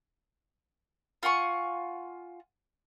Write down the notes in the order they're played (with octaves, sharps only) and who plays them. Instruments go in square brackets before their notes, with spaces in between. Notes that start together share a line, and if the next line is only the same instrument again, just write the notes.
[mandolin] F4 F#5 G#5 C#6